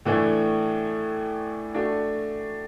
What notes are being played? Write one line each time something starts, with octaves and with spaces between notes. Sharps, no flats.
A2 E3 A3 D4
A3 D4 F#4